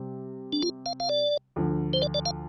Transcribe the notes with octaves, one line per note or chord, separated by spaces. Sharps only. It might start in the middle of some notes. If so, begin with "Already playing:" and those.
Already playing: C3 G3 C4
D4
F4
F5
F5
D5
D2 D3 F3
C5
D5
D5
F5